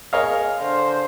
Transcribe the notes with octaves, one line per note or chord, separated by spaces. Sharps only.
G#4 A#4 C#5 D#5 F5
D3 C5